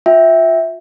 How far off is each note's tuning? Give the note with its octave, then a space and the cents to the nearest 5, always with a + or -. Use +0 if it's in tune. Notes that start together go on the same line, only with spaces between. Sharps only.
F4 +30 E5 -10 G5 +0